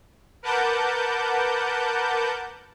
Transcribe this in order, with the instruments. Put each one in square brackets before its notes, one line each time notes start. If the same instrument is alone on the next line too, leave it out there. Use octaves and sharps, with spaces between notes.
[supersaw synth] A#4 B4 F#5 A5 D6 G6